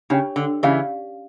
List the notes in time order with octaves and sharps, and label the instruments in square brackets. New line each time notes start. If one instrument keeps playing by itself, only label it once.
[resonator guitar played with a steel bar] C#3 [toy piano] D4 G4 C#5 G5
[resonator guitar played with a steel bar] D3
[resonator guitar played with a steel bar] C#3 E3 [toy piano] C#4 G4 D5 F5